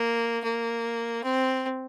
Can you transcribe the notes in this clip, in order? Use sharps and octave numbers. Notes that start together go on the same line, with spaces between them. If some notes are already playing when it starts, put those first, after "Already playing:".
Already playing: A#3
A#3
C4